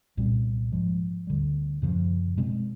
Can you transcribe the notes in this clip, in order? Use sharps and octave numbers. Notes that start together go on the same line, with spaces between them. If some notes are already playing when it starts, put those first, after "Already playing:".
C2 A#2 G3 C4
G#2 F3 G#3
D2 D3 G3
F#2 C#3 F3
B2 G#3 C4